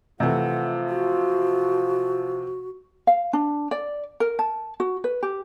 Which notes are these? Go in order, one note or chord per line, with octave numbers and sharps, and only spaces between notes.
C3 E3 F3 A3 F4 F#5
F#4
F5
D4
D5
A#4
A5
F#4
B4
G4